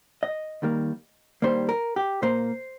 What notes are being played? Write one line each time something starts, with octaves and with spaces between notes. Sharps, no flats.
D#5
D#2 D#3 G3 A#3
D#2 D#3 G3 A#3 C5
A#4
G4
A#2 A#3 C5